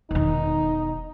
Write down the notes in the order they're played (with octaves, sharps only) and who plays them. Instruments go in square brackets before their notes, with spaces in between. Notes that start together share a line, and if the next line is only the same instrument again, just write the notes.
[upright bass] E1 D#3 [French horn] D#4